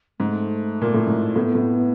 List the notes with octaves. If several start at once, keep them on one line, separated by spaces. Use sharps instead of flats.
G#2 A3
A#2
A2
G#2
A2 B3
A2